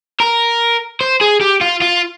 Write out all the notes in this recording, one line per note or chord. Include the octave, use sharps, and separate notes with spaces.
A#4
C5
G#4
G4
F4
F4